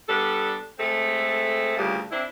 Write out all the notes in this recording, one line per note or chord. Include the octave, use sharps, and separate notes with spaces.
G3 B3 D4 A4
G#3 A3 C4 A4
D2 G2 A#2 C#3 G3
C4 D4 E4